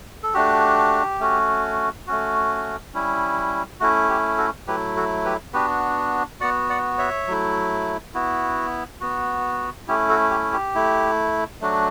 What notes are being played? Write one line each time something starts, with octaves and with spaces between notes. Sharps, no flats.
A4
A3 D4 F#4 G4
A3 C#4 F#4
A3 C#4 F#4
G3 C#4 E4
A3 C#4 E4 F#4
G4
F#4 A4
F#3 A3 E4 G4 B4
F#4 A4
G4 B4
B3 D4 F#4 G4 B4
B3 F#4 D5 F#5
D5 F#5
C#5 E5
F#3 A3 E4
B3 E4 F#4
B3 F#4
A3 C#4 E4 G4
F#4 A4
G4
G4
A3 E4
F#3 A3 D4 F#4